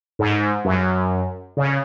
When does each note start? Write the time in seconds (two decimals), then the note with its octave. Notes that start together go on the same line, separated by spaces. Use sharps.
0.19 G#2
0.65 F#2
1.57 C#3